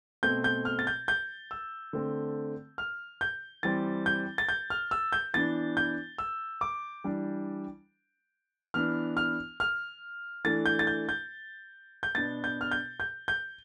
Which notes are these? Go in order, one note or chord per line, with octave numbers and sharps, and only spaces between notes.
B2 A3 C4 G6
G6
F6
A6
G6
G6
E6
D3 A3 C4
F6
G6
E3 G3 C4 A6
G6
A6
G6
F6
E6
G6
E3 B3 D4 A6
G6
E6
D6
E3 G3 D4
E3 B3 D4 F6
F6
F6
E3 A3 D4 A6
G6
A6
G6
G6
G6
B2 B3 D4 A6
G6
F6
G6
G6
G6